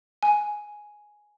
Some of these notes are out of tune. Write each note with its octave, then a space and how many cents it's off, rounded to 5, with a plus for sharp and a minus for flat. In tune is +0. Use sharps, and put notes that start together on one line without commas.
G#5 +5